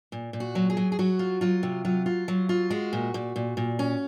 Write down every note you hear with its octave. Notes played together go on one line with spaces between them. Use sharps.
A#2
A#2
F#4
F#3
G#4
F#3
G#4
F#3 F#4
F4
F#3 F4
C3
F#3 F4
F4
F#3
F4
G#3 F#4
A#2
A#2
A#2
A#2
C#4